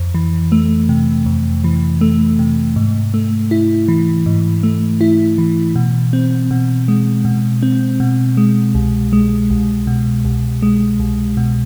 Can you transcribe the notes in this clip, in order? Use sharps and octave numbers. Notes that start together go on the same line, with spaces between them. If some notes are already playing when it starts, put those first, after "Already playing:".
Already playing: F2
E3
A3
C3
F2
E3
A3
C3
G#2
A3
E4
E3
G#2
A3
E4
E3
B2
C4
B2
G#3
B2
C4
B2
G#3
C2
G#3
C2
B2
C2
G#3
C2
B2